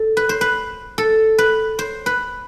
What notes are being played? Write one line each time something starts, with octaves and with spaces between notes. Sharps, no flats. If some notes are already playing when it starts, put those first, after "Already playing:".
Already playing: A4
B4
C5
B4
A4
B4
C5
B4